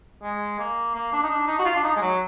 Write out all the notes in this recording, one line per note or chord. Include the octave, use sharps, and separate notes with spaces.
G#3
A#3
A#3
D4
D#4
D4
D#4
F#4
F4
D4
D#4
G#3
F#3